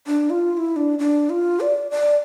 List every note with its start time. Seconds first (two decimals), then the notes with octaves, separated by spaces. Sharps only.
0.07 D4
0.30 F4
0.53 F4
0.57 E4
0.76 D4
0.99 D4
1.30 F4
1.61 D5
1.91 D5